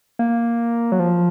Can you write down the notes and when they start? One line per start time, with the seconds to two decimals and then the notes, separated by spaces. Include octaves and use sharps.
0.19 A#3
0.92 F#3
0.99 F3